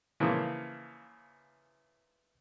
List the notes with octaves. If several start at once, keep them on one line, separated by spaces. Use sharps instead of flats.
C#3 E3 F3 A#3